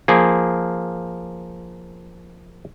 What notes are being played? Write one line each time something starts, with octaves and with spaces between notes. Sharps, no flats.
F3 A#3 G#4